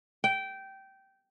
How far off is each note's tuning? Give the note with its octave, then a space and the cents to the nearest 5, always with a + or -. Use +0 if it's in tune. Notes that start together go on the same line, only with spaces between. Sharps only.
G5 -15